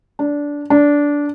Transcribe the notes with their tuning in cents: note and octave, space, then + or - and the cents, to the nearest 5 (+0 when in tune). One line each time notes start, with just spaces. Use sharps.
D4 -15
D4 -15